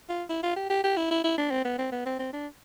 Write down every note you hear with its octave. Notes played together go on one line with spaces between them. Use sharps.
F4
E4
F4
G4
G4
G4
E4
E4
E4
D4
C4
B3
C4
B3
C4
C4
D4